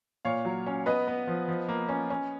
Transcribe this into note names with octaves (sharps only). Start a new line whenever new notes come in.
A#2 C#5 F5
F#3
C#4
B3 B4 D#5
B3
F3
F3
A#3
C#4
C#4